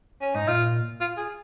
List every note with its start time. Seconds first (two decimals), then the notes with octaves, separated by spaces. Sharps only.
0.21 C#4
0.35 G#2 D#4
0.48 A#2 F4
1.01 F4
1.17 G#4